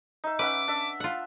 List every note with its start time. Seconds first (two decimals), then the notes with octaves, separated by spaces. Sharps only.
0.24 D#4 E5
0.39 C#4 B4 E5 F#5 D6
0.68 D4 E5
1.00 F4 F#5